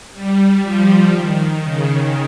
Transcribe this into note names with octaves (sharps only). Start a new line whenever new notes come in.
G3
F3
D#3
C#3